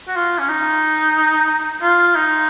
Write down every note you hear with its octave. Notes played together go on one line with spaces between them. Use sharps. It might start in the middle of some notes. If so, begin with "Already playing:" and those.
F#4
F4
C#4
D#4
F4
D#4